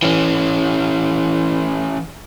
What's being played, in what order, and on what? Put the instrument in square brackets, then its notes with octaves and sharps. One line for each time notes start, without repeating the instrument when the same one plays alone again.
[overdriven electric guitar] E3 C#4